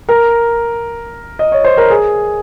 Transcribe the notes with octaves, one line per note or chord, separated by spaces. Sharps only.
A#4
D#5
C#5
C5
A#4
G#4